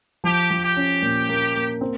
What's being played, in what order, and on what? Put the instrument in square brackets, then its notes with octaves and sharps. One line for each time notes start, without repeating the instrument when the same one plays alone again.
[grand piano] F3 [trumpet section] G4
[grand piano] F3
[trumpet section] G4
[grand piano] C#4
A#2
A#3
A#3
C4